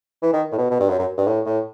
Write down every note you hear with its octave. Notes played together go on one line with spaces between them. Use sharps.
E3
D#3
A2
B2
B2
G2
F#2
F#2
G2
A2
A2